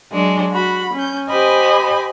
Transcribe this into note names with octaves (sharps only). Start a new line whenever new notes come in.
F#3 G#3 D4
F#4 B5
C#4 G6
G4 C5 D#5 G#5 B5